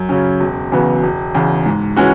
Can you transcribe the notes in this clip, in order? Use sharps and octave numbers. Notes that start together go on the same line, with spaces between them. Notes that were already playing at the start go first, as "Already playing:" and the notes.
Already playing: F#2
C#3 F#3 C#4
E1
E2 C#3 F#3 B3
E1
E2 C#3
G#2
E3 G#3 C#4 F#4